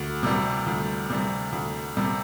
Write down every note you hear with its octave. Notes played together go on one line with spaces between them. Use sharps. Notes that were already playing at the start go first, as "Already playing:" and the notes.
Already playing: D2
C3 G3
D2
C3 G3
D2
C3 G3